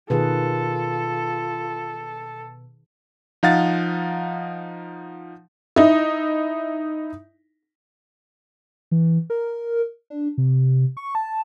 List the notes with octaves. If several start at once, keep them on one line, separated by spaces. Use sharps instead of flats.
B2 D#3 F4 G#4 A4 B4
F3 D#4 F5 F#5 A6
D#4 E4
E3
A#4
D4
C3
C#6
A5